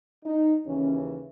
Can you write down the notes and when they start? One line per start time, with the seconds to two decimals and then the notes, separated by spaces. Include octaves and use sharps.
0.25 D#4
0.64 D#2 C#3 E3 C#4